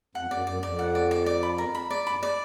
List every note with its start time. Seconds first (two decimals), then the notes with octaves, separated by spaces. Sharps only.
0.15 F2 F#5
0.31 F#2 D5
0.47 F#2 D5
0.63 F2 D5
0.79 F#5
0.95 D5
1.11 D5
1.26 D5
1.43 B5
1.58 A#4
1.75 B5
1.90 D5
2.07 G2 B5
2.15 F#2
2.23 D5